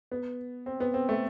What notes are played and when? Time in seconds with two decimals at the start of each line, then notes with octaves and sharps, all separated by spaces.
0.12 B3
0.66 C4
0.80 B3
0.94 C4
1.09 A3